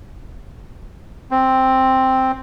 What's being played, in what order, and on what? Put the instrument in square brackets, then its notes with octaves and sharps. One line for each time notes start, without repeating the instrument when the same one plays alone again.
[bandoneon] C4